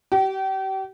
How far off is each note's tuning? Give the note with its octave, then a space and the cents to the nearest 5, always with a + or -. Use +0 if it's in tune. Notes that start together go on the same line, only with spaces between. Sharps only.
G4 -35